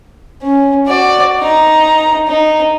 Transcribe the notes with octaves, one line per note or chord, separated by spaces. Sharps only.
C#4
F#4 D5
D#4 A#5
D#4